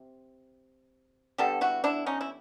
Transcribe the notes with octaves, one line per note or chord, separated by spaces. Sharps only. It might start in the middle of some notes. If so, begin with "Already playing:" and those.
Already playing: C3
D3 G3 B3 G4 A4
E4 F#4
D4 E4
C#4 D#4
E4